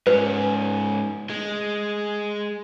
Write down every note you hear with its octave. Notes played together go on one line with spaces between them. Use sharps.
G#2 C#4 B4
G#3